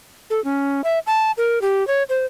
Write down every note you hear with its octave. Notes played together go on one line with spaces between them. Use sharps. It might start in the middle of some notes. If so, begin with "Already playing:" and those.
A4
C#4
E5
A5
A#4
G4
C#5
C5